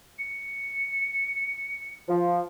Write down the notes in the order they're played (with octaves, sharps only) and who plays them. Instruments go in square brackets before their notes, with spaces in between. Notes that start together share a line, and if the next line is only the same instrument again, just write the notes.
[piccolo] C#7
[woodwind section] F3